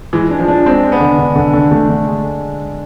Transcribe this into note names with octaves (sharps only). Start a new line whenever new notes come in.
E3 G#3
D4
F3
D4
G#3 C4
G#3
B3
D3
D3
D3
D3
D3 A3
D3
G#3